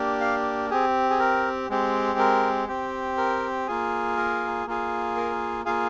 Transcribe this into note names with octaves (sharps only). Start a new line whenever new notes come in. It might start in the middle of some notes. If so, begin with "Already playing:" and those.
Already playing: A#3 D4 G4
F5
C4 G4 G#4
G#4
A#4
G#3 C4 G4
A#4
C4 G4
A#4
A#3 F4 G#4
A#4
A#3 F4 G#4
A#4
A#3 F4 G#4 F5